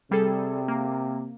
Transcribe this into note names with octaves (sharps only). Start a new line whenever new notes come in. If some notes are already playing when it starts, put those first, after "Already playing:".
C3 G3 G#4 A4
A#3